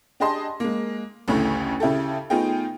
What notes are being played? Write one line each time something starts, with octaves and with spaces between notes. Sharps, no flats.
D4 G4 G#4 D#5 A5 C6
G#3 A#3
A1 D2 A2 C#3 A3
C#3 E4 G4 A4
A3 B3 D#4 F4 G#4 G5